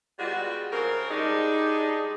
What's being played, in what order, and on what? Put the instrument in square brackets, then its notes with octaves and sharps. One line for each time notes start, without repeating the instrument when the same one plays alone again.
[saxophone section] G3 G#3 B3 F4 F#4
C#3 C4 A#4
G3 G#3 D4 D#4